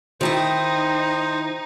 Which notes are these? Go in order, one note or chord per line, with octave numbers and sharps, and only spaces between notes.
D#3 D#4 E4 C5 G5